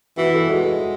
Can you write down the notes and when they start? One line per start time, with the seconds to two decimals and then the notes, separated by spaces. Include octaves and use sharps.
0.17 E3 F#4
0.34 A4
0.50 G#3 F#4